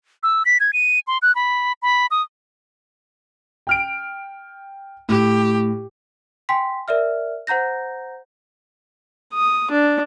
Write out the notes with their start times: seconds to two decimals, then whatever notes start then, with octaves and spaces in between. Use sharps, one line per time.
0.23 E6
0.45 B6
0.60 G#6
0.73 D#7
1.07 C6
1.22 F#6
1.35 B5
1.82 B5
2.11 D#6
3.67 G5 F6 D7
5.09 A2 G4
6.49 G5 G#5 C6 B6
6.88 A#4 D5 E5 F6
7.47 C5 F#5 A#5 G6 A#6
9.34 D#6
9.71 D4